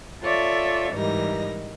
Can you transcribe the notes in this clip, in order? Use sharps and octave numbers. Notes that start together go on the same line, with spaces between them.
F4 A4 C#5 D5 E5
G#2 E3 G3 D#4 A#4 A#6